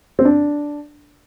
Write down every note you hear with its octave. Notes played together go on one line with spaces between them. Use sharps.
C4
D4